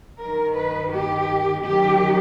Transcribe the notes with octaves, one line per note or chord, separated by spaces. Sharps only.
G2 D#3 A#4
B4
G4
F#2 G4
D#3